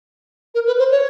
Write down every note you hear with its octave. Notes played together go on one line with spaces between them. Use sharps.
A#4
B4
C5
C#5